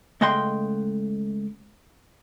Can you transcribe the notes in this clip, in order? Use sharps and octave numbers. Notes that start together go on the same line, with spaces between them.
C#2 A3 D#5 F#5 G5 C6